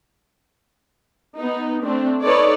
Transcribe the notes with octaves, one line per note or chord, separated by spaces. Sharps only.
B3 D#4
A3 C4 D4
D#4 A4 B4 C#5 D5